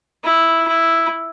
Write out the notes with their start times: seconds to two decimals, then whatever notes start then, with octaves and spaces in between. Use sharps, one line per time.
0.24 E4
0.68 E4